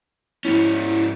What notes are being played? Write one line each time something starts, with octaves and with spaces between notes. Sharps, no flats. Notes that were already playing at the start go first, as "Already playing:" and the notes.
G#2 C#4 E4